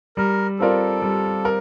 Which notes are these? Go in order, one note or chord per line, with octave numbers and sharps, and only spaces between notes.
G3 A#4
C4 F4 A4 A#4 D5
G3
A#4